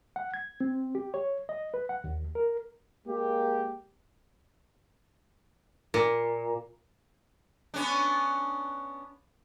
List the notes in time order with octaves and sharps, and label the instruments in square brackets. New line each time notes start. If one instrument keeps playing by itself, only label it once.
[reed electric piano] F#5
G#6
C4
G4
C#5
D#5
B4
F#5
D#2
A#4
[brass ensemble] G#3 A#3 G4
[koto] A#2
[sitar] B3 C#4 D4